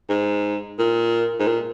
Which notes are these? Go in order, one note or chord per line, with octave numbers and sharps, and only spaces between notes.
G#2
A#2
G#2
A#2